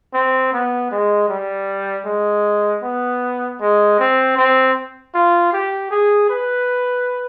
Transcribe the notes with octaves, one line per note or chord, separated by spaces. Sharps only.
C4
B3
G#3
G3
G#3
B3
G#3
C4
C4
F4
G4
G#4
B4